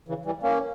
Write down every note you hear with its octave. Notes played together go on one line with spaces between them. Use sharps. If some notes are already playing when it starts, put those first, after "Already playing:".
C#3 E3
E3 G3
A#3 C#4